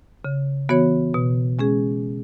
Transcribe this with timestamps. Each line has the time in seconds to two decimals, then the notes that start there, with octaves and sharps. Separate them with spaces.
0.25 C#3
0.69 E3 B3 F#4 C#5
1.14 B2
1.59 G#3 C#4 G#4